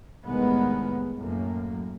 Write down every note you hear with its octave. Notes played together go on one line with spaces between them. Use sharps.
C2 A2 D#3 G#3 B3
F#2 A2 A#3